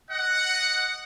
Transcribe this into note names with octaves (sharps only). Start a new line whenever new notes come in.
D#5 F#5